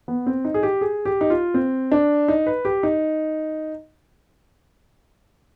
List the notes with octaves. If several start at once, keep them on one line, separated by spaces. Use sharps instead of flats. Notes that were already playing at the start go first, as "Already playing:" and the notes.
B3
C4
D#4
G#4
G4
G#4
G4
D#4
F4
C4
D4
D#4
B4
G4
D#4